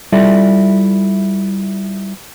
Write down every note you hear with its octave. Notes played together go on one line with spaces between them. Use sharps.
G3 E4 F4 A4 D5 E5